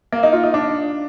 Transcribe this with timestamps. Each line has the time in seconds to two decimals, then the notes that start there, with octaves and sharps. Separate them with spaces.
0.13 A#3
0.23 D#4
0.33 F4
0.43 D#4
0.54 D4